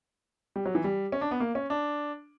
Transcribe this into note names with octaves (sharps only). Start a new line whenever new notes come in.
G3
F#3
E3
G3
C#4
D4
B3
A#3
C#4
D4